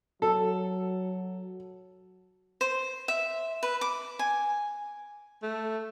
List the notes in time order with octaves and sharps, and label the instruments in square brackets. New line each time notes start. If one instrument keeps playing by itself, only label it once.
[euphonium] F#3 [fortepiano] A4
[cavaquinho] C5
E5
B4
D6
G#5
[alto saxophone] A3